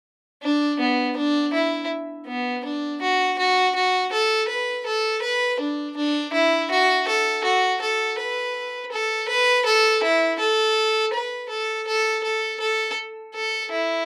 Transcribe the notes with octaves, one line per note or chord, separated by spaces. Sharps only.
D4
B3
D4
E4
B3
D4
F#4
F#4
F#4
A4
B4
A4
B4
D4
D4
E4
F#4
A4
F#4
A4
B4
A4
B4
A4
E4
A4
B4
A4
A4
A4
A4
A4
E4